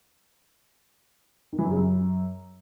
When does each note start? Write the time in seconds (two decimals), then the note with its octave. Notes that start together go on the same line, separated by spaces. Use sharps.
1.53 D#3
1.59 E3
1.64 F#2
1.70 C#3
1.76 F#2